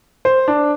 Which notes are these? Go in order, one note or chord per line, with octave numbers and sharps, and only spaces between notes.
C5
D4